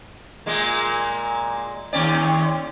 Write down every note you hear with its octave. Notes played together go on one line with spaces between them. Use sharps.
A#2 G#3 A#3
D#2 C#4 D5